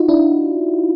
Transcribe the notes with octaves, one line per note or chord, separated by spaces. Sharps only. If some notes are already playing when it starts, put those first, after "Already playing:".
Already playing: D#4 F4 F#4
D4 E4